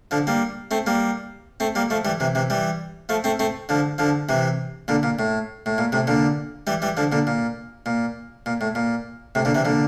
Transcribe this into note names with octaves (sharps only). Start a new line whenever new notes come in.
D3 F3
G3 A#3
A3 C4
G3 A#3
A3 C4
G3 A#3
F3 A3
E3 G3
C3 E3
C3 E3
E3 G3
F3 A3
A3 C4
A3 C4
D3 F3
D3 F3
C3 E3
A#2 D3
A#2
A2
A2
A#2
A2 C3
A#2 D3
E3 G3
E3 G3
D3 F3
A#2 D3
A#2
A#2
A#2
A2
A#2
A2 C3
A#2 D3
C3 E3
A#2 D3